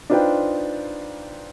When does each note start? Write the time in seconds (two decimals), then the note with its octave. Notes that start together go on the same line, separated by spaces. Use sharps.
0.10 D4 D#4 F4 B4 C5 G5